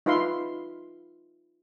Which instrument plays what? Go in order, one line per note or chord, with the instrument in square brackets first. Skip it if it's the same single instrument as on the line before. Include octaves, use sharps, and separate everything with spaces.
[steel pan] D#4 F4 B4 E5 F5 C6